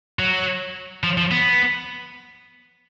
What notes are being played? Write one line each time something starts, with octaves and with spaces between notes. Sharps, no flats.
F#3
F3
F3
B3